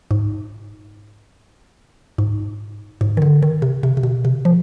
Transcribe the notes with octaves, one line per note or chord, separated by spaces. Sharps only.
G#2
G#2
G#2
D#3
D3
D#3
C3
C3
C3
B2
C3
F3